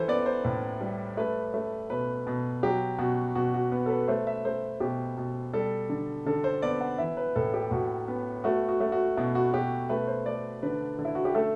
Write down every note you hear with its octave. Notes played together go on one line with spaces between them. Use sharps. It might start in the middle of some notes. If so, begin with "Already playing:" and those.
Already playing: E3 A4 C5
B3 D5
C5
A2
G3
A3 B4
A3
B2 B4
B2
F#3 G4
B2 F#4
B2 F#4
F#4
B3
A4
B4
A3 C5
E5
A3 C5
B2 G4
B2
G3 A4
D3
D3 A4
C5
B3 D5
F#5
E3 E5
B4
A2 A4
G4
A2 F#4
B3
A3 F#4
F#4
A3
F#4
B2 E4
F#4
B2 G4
A3 B4
C5
A3 D5
D3 B4
D3
E4
F#4
G4
A3 A4